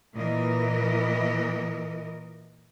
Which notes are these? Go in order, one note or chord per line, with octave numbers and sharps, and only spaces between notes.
A#2 E3 A#4 D#5